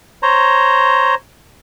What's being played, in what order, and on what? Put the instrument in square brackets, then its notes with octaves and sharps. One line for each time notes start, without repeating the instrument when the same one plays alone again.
[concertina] C5 C#5 A#5